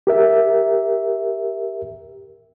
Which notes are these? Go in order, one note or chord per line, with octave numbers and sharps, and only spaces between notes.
G4 A#4 E5